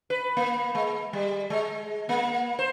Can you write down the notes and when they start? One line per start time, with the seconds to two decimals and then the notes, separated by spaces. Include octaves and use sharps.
0.10 B4
0.37 A#3
0.75 G#3
1.13 G3
1.50 G#3
2.09 A#3
2.59 C5